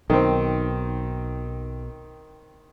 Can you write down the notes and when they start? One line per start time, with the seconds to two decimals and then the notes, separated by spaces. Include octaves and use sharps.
0.10 B1 D#3 C4